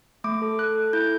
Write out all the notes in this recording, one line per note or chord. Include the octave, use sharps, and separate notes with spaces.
A3 D6
A4
A4 F#6
A4
E4 G6